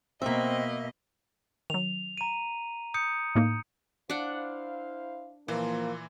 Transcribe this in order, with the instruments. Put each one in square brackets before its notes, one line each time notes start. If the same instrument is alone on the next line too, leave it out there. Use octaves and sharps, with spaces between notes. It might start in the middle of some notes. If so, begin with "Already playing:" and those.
[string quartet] B2 [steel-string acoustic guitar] A#3 E5 [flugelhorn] C4 [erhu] D#5
[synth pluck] D#3 F#3 [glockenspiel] F7
[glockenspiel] A#5 D#7
D#6 G6 C#7
[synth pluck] A2 A#3 D#4
[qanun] D4 F#5 [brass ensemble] E4 C5 F5
[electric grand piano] A#2 E3 [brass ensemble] F3 [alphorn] A#3 [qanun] C5